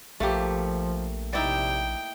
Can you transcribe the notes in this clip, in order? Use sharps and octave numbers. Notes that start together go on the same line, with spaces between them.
A#1 F3 A3 A#3 G4
C3 D#4 E4 D5 G5